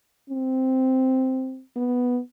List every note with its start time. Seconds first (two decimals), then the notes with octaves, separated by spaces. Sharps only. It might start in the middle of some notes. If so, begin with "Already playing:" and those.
0.30 C4
1.76 B3